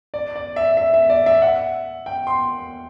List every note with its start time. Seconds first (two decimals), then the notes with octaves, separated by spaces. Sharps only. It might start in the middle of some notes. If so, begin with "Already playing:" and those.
0.14 D5
0.36 D5
0.56 E5
0.77 E5
0.94 E5
1.10 D5
1.26 E5
1.42 F#5
2.06 G5
2.27 C6